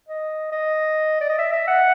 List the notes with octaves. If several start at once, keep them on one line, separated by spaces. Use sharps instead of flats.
D#5
D#5
D5
D#5
E5
E5
F#5